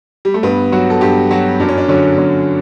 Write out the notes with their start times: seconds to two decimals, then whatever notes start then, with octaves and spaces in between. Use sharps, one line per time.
0.25 G3
0.34 A3
0.43 G2 B3
0.72 F#3 F#4
0.90 A4
1.01 G2 G4
1.31 F#3 F#4
1.60 F#2 D4
1.69 C#4
1.78 D4
1.88 D3 F#3 C#4
2.18 F#2 C#4